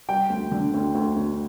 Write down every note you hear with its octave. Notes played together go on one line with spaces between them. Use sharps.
G3 G5
D2
D3
D2
D2
D2